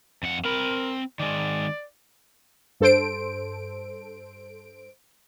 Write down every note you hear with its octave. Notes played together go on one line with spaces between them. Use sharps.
F2 F#5
C4 A#4 B5
D#3 G#3 D5
G2 A4 C5 D7